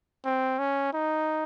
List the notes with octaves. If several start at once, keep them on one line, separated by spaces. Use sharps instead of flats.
C4
C#4
D#4